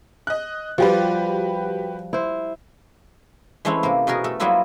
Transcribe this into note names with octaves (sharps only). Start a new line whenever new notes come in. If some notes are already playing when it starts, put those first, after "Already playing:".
D#5 F#6
F3 G3 F#4 G4 B4
E4 C5
E3 G#3 A3 C4 C#4 E4
C3 A#3
B2 F#4 G#4 A#4
A3 A4
F#3 G3 A#3 B3 E4 F4